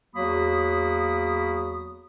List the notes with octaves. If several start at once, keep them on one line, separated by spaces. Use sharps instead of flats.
E2 F#3 A#3 F#4 B5 D#6